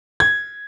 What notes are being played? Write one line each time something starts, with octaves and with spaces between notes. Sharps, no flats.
G#6